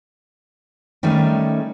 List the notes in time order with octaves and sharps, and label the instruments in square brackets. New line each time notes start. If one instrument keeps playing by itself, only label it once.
[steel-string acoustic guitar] D#3 G3 A3 C#4 D#4